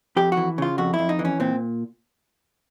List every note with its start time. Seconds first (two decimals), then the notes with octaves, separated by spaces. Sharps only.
0.16 F2 G4
0.32 F#4
0.37 E3
0.58 C#3 F4
0.78 F2 F#4
0.94 E4
0.99 F2
1.09 D#4
1.19 E3
1.25 C#4
1.40 A#2 C4